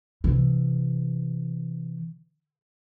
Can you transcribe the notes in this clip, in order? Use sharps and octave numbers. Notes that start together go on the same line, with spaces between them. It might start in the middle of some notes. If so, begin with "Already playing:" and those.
C3 E3